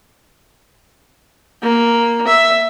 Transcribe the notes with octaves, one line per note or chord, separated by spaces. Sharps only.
A#3
E5